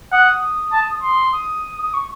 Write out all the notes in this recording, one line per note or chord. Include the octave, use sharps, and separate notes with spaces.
F#5 D#6
A5
C6
D#6
D#6
C#6